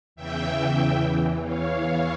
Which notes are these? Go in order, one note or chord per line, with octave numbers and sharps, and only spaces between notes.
E2 C#3 E3 E5 G5
E2 E3
C#5 F5